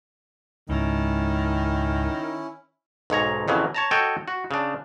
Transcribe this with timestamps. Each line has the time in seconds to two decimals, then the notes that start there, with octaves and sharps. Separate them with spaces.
0.69 C#2 G#2 D#3 C#4 E4
3.10 B1 G#2 C#5 A#5
3.48 F2 C#3 E3 F#3
3.74 C#5 A5 A#5
3.91 F#4 A4 C#5 D#5 G5
4.28 F#4
4.51 C#3 D4